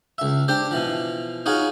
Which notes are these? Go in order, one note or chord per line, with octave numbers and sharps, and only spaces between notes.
C#2 E5
D4 G4 C5
B2 E3 F3
D#4 F4 F#4 G#4 C#5